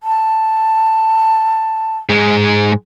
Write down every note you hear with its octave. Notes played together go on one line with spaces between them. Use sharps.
A5
G#2 G#3